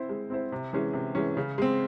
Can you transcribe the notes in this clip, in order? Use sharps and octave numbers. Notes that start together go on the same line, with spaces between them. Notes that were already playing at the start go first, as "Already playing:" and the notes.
Already playing: C4 E4 C5
G#3
C4 E4 C5
C3
E3 G#3 C#4
C3
E3 G#3 C#4
C#3
G#3 C4